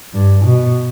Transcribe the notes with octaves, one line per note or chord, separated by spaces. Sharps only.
G2
B2